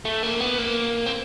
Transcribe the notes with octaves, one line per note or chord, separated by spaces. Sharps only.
A3
A#3
B3
A#3
C4